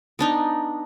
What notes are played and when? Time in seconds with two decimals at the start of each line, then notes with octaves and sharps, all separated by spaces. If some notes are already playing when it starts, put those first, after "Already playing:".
0.19 B3 D4 D#4